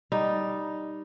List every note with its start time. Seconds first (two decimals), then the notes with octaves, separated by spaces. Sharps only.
0.12 G3 D#4